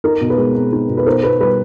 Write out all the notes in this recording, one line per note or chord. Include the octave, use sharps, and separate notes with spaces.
D#4 A#4
B2
B4
G#3
C4
D#4
B2
B4
D#4 A#4 C5
B2 B4
G3 B4